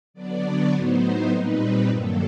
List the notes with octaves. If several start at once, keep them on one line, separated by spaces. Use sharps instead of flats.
D3 F#3 B3 D4 D5
C#5
A2 F#3 B3 D#4 C5
A#2 G3 C4 D#4 B4
G2 D#3 F#3 A#3 A4